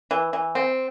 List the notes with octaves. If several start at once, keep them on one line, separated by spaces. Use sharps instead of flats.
E3
E3
C4